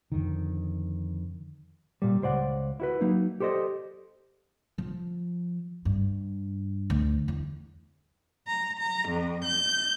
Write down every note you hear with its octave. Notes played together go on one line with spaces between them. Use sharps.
F2 D3 D#3
A#2 G3
C#2 C5 D5 F#5
E4 F#4 B4
F#3 A#3 D#4
G4 A4 C5 D5 D#5
F3
G2
D2
E2
A#5
A#5
F2
G6